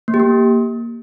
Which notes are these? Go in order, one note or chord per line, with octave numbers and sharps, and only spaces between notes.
A#3
G4
A#3